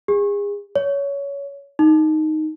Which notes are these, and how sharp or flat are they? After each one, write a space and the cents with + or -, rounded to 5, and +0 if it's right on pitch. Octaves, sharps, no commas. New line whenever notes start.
G#4 -35
C#5 +20
D#4 +0